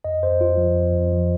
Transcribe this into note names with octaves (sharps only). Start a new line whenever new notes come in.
F2 D#5
F2 C5
F2 F4
F3
F2
F2
F3